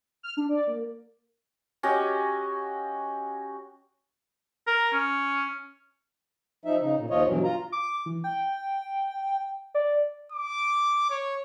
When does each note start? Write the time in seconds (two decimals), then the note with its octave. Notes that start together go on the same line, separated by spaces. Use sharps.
0.23 F6
0.37 D4
0.49 D5
0.67 A#3
1.83 C#4 F#4 G4 D#5
4.67 A#4
4.93 C#4
6.65 F3 D#4 E5
6.81 C#3 D#4
6.97 A#2
7.10 D#2 F3 F4 C#5 D#5
7.26 G2 B2 E3 F#3
7.44 F4 A#5
7.72 D6
8.06 E3
8.24 G5
9.75 D5
10.32 D6
11.10 C#5